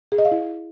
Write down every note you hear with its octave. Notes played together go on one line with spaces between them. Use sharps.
G#4
D#5
F5
E4